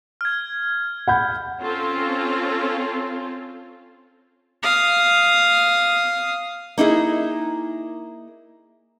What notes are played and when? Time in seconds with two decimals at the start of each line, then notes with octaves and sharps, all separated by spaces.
0.21 F6 G#6
1.08 F#5 B5 G6
1.61 C4 C#4 F4 A4
4.63 F5 D#6
6.78 A#3 D#4 E4 G#4